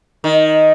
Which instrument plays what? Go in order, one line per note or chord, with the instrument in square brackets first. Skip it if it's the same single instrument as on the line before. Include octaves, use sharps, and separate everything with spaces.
[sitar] D#3